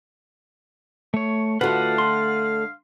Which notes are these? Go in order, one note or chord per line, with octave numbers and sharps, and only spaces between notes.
A3 C#5
D3 A3 F4 F#4 B4 F5 F#5
C6